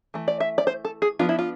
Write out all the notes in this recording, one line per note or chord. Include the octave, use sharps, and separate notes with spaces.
E3 A3
D5
E5
D5
C5
A4
G#4
F3 B3 D4 F4
E4
F4